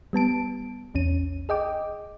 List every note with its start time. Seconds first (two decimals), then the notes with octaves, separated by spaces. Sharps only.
0.13 G3 B3 A5 D7
0.94 A#1 E2 C#4 D#7
1.49 G#4 D#5 G5 D6